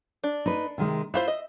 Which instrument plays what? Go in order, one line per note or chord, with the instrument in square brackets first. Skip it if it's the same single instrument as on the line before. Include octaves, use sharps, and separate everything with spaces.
[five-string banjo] D4
[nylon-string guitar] D#4 B4
C3 D#3 G#3
[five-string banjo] E4 F4 C5 [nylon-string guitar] E5
[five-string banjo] D#5